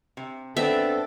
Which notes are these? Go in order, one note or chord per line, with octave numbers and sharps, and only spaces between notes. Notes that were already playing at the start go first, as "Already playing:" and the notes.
C3
B3 C4 D4 A4 E5